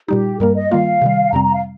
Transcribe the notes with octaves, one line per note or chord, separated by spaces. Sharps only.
A#2 G3 D#4 G4
G2 G3 A#3 A#4
D#5
D#3 G3 A#3 F4 F5
C3 D#3 G3
F2 C3 G3 C4 A#5
A#5
F5